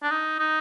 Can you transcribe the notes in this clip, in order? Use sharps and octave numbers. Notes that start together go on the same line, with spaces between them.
D4
D#4
D#4